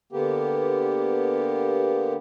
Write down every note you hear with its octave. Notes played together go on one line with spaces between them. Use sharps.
D3 A#3 B3 G4